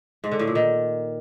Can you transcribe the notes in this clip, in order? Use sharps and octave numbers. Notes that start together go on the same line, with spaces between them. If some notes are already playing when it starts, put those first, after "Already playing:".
G#2
D3
A2
A#2
D#3